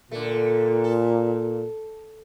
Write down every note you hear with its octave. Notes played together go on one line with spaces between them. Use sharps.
A#2 D3 A3
A4